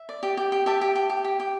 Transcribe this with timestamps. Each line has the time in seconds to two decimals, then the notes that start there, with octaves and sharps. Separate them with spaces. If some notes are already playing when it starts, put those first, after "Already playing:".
Already playing: E5
0.09 D5
0.23 G4
0.37 G4
0.52 G4
0.66 G4 E5 A5
0.81 G4
0.95 G4
1.10 G4
1.24 G4
1.40 G4